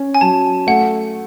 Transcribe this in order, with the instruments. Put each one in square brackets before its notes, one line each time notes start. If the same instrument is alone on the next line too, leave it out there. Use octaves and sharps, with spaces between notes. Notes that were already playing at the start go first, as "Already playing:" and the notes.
Already playing: [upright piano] C#4
[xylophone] G#5
[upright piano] F#3 [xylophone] A5
[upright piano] A3 [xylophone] F#5